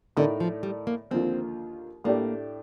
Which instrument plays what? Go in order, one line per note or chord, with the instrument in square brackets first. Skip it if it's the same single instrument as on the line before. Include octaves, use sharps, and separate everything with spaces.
[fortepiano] A2 A3 D#4 A#4 D5 [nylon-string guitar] D3
[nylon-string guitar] F3
G3
A#3
[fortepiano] D#2 D3 F3 A#3 F4 [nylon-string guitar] C4
[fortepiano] A2 A3 D4 G4 D5 [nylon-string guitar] A#3